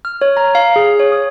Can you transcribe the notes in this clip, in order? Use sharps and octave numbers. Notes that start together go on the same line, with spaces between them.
F6
C#5
A#5
F5
G#4
C#5
D#6